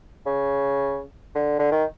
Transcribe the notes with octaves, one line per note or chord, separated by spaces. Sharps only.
C#3
D3
D3
D#3